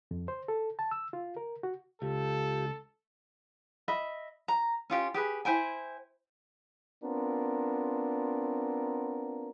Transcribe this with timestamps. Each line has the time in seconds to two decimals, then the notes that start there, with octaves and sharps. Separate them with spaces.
0.11 F2
0.28 C5
0.48 A4
0.79 A5
0.91 E6
1.13 F4
1.37 A#4
1.63 F#4
2.02 C#2 F4 G4 A4
3.88 D#5 E5 B5
4.48 A#5
4.90 C#4 F4 G4
5.14 G4 G#4 B4
5.45 E4 C5 G5 G#5
7.04 B3 C4 D4 F4 A#4